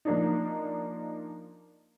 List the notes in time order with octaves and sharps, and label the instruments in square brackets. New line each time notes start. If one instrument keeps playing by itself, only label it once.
[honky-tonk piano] F3 A#3 D4 D#4